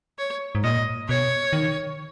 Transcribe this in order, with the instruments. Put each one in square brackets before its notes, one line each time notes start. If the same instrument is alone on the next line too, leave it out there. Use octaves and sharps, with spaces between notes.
[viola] C#5
[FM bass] G#2
[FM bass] A#2 [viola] D#5
[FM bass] B2 [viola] C#5
[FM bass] D#3